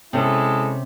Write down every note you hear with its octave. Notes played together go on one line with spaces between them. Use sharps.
C3 G#3 C#4 E4 A4